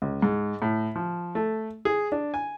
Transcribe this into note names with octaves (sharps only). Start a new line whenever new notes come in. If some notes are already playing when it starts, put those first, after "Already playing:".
C#2
G#2
A2
F3
A3
G#4
D4
G#5